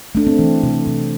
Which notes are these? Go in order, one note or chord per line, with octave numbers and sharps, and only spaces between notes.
A3 D4
C4
E3
C3
C3